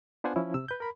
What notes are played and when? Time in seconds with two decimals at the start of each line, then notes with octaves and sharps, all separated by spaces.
0.24 B3 D4 F4 C5 F#5 G#5
0.36 F3 C#4 E4
0.54 C3 E6
0.68 B4 G6
0.80 A#4 B5